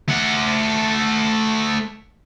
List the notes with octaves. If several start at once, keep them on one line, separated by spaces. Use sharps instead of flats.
A3 F#5